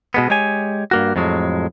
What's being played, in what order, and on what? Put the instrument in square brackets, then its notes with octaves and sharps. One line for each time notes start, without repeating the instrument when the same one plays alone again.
[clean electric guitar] B2 G#3 B3
G#3 G4 C#5 G#5
G2 A#3 F#4
F2 A2 F#3 G#3